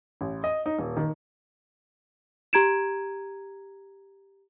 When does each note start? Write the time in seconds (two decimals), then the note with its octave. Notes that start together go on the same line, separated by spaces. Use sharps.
0.21 A1
0.44 D#5
0.66 D#4
0.78 D#1
0.97 D#3
2.53 G4 A#5 G#6 D7 E7